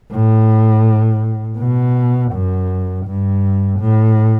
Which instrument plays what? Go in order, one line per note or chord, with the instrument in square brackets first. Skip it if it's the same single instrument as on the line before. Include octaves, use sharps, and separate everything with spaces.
[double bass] A2
B2
F#2
G2
A2